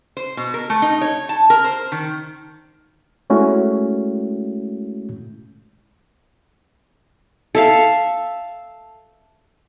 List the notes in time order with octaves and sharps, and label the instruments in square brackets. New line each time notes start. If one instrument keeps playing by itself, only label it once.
[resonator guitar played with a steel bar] C5
B2
A#4
A3
D#4
C#5
A5
A#4
C5
D#3
[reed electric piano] G#3 A3 C#4 E4 F#4
[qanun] A4 E5 F5